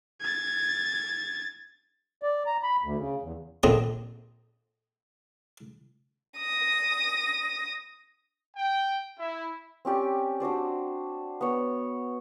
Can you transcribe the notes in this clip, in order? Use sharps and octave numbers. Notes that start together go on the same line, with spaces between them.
G#6 A6
D5
A#5
B5
D2
C#3
E2
A#1 D3 C4 A#5 D#6
D#6 A#6
G5
E4
C4 C#4 G4 D5
D4 F#4 C5 D5
B3 C#5